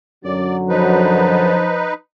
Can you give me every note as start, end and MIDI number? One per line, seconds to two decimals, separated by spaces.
0.25 1.63 42
0.25 1.63 50
0.25 1.63 54
0.25 0.57 74
0.69 1.92 53
0.69 1.94 63
0.69 1.94 71